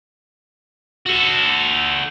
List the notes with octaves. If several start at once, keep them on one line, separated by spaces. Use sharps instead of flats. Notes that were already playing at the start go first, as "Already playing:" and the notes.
F#4 A4